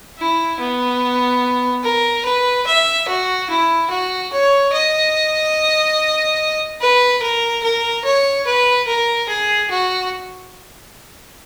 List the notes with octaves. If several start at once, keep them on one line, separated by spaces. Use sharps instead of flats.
E4
B3
A#4
B4
E5
F#4
E4
F#4
C#5
D#5
B4
A#4
A#4
C#5
B4
A#4
G#4
F#4